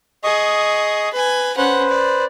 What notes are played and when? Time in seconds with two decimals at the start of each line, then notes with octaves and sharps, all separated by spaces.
0.24 G#4 D#5 C#6 D#6
1.13 B4 G#5
1.57 C#4 B4 C5 F#5
1.89 D5